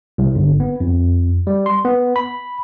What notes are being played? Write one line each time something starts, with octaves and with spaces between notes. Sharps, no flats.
C2
G1
B3
F2
G3
C6
B3
B5